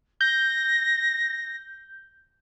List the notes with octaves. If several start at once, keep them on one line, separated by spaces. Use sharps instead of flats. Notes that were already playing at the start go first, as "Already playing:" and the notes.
G6 A#6